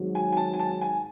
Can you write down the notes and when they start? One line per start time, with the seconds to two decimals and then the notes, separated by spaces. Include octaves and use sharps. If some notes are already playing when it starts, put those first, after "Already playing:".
Already playing: G#1 G#2 F#3
0.15 G#5
0.32 G#5
0.37 A5
0.53 G#5
0.59 A5
0.81 G#5